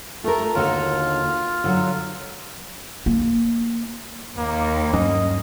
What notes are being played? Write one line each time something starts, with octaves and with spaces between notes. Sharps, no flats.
A3 F4 A#4
D#2 D3 F4 F#4
D3 F3 F#3
A#3
D#2 A#3
G2 F#3 C#4 D#5